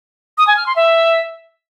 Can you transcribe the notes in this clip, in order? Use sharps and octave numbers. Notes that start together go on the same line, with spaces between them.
D#6
G#5
F6
C6
E5